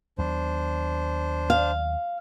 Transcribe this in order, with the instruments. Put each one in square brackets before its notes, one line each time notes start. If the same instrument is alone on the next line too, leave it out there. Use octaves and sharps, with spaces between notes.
[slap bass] D#2 F#3 B3 [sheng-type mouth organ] D4 C5
[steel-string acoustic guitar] F5